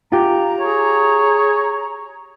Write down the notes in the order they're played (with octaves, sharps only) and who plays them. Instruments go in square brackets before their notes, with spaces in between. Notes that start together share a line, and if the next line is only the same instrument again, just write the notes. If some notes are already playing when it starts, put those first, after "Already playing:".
[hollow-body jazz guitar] F4 G4 [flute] A#5
[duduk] G#4 [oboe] C#5